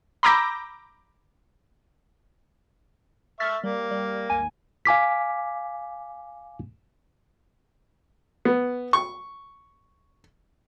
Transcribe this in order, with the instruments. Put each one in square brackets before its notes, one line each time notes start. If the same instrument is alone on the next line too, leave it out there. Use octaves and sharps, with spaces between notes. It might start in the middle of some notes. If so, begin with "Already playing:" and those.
[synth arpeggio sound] A#5 B5 D6 E6 G6 A#6
[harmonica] E5 C#6 [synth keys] F6 A6 B6
[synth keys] G3 [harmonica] A#3
[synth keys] G3
G#1 D#2 G#5
[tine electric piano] F5 G#5 D6 B6
[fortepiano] B3
C#6